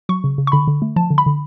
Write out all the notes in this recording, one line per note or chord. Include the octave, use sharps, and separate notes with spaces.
F#3 C#6
C#3
C#3
C#6
D3 B5
D3
A3
F3 A5
D3
B5
D3